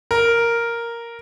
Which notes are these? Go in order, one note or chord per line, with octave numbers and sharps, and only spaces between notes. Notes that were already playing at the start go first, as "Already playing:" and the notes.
A#4